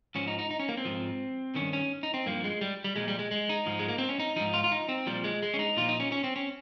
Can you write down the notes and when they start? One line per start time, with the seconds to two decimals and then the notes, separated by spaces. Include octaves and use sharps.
0.15 G#2 F3 C#4
0.27 D#4
0.39 D#4
0.51 D#4
0.60 C#4
0.69 A#3
0.77 C4
0.85 G#2 F3
1.55 G2 D#3 C#4
1.73 C#4
2.03 D#4
2.14 C4
2.26 G2 F3 A#3
2.44 G#3
2.61 G3
2.84 G3
2.96 A#2 F3 G#3
3.08 G3
3.19 G#3
3.31 G#3
3.49 D#4
3.66 G#2 F3
3.79 G#3
3.89 A#3
3.98 C4
4.09 C#4
4.19 D#4
4.36 G#2 F3 D#4
4.54 F4
4.64 F4
4.72 D#4
4.89 C4
5.06 A#2 F3 G3
5.24 G#3
5.43 G#3
5.54 C#4
5.59 D#4
5.77 A#2 F3 F4
5.89 D#4
6.00 C#4
6.12 C#4
6.24 C4
6.36 C#4